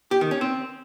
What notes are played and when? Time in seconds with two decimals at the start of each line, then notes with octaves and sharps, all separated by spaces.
0.11 G4
0.21 D#3
0.31 C#4
0.41 C4